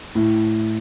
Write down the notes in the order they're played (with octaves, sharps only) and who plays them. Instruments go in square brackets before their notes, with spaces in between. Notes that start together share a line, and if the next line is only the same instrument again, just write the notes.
[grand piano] A2